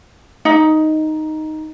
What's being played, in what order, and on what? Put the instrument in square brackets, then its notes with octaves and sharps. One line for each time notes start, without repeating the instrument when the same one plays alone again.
[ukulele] D#4